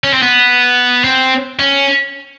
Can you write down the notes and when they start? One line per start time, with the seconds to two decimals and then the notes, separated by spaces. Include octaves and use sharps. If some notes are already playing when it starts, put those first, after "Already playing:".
0.04 C#4
0.13 C4
0.22 B3
1.04 C4
1.59 C#4